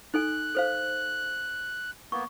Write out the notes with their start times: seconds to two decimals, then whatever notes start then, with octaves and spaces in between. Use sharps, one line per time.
0.14 D#4 A4 G#5 F#6
0.55 A4 C5 F5
2.12 A#3 B3 C#6